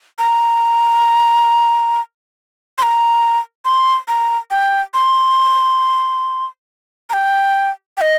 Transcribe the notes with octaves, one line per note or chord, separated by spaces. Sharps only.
A#5
C6
A#5
C6
A#5
G5
C6
A#5
G5
G5
D#5